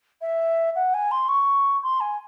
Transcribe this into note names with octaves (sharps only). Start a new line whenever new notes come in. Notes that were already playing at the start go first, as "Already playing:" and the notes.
E5
F#5
G#5
C6
C#6
C6
G#5